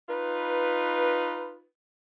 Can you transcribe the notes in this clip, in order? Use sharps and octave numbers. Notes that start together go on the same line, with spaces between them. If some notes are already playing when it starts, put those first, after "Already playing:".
D#4 F4 B4